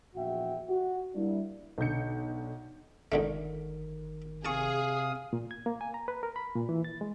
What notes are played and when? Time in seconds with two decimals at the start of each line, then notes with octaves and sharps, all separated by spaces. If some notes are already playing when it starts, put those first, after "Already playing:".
0.16 A#1 E2 F#4 E5 G5
0.69 F#4
1.15 G3 A#3 D4 E4
1.78 B1 D3 G6 C#7
3.12 G1 C#2 D3 D#3 A3 A#4
4.45 C3 G#4 F5 A5 C#6 D#6
5.33 A#2
5.51 G#6
5.66 A#3
5.81 G#5
5.94 A#5
6.08 B4
6.23 A#4
6.36 B5
6.56 A#2
6.69 E3
6.84 A6
7.01 G#3